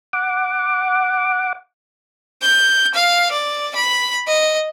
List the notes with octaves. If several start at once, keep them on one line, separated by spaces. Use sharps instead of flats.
F#5 D6
G6
F5
D5
B5
D#5